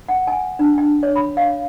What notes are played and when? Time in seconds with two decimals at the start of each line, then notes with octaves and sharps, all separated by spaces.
0.08 F#5
0.27 G#5
0.59 D4
0.78 G5
1.03 C#5
1.16 B5
1.37 F5